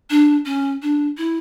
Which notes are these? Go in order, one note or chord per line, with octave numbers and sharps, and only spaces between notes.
D4
C#4
D4
E4